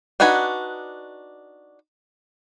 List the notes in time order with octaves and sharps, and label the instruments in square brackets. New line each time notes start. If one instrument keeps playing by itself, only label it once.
[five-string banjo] D4 D#4 F#4 B4 G#5